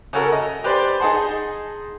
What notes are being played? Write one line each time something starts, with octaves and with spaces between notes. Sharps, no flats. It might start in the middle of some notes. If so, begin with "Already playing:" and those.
C#3 C#4 F#4 A4 A#4
D#5
G4 B4 C5 D5
D#4 G#4 F#5 A5 C6